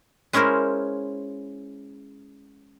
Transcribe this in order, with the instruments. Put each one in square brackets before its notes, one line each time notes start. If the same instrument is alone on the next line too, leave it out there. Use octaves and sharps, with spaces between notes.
[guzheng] G#3 C#4 E4 A#4 C5